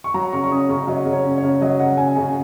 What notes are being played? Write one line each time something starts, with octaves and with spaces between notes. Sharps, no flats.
C#6
F#3 A#5
C#3 C#6
C#6
C#4 D#6
C#3 C#6
F#3 D#5
C#3
C#5
C#4
C#5
C#3
F#3 D#5
C#3 F#5
C#4 G#5
C#3 G#5